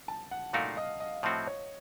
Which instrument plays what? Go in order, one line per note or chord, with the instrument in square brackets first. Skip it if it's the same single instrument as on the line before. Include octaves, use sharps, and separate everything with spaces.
[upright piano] A5
F#5
[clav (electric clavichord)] A#2 A3 D#4 F#4 A#4 [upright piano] F5
[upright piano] D#5
D#5
[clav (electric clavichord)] A2 F3 A3 C4 F#4 [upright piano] D#5
[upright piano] C#5